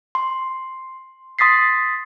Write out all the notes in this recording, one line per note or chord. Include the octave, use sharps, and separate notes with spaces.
C6
C6 D#6 A6 B6 C7